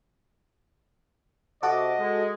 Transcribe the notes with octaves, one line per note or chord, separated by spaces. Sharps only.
C3 F#4 A4 D#5 D6
G#3